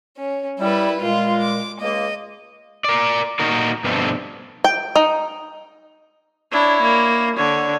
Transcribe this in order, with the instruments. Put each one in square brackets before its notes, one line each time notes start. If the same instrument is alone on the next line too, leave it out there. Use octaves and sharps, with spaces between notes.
[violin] C#4
[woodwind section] G3 [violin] E4 B4
[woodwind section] A#2 G#3 [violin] F4
[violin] D6
[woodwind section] C#2 G#3 A#3 [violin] D#5
[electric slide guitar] A#4 D5
A#2 D#4 F#4 A#4
G2 B2 D3 F3 A3 C4
[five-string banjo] G5
D#4
[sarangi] D4 [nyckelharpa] E4 C#5
[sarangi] A#3
[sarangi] D3 [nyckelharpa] C#5